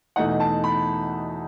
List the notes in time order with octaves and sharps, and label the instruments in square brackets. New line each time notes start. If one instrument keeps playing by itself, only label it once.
[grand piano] E2 B2 A3 D#4 F#5
A5
B5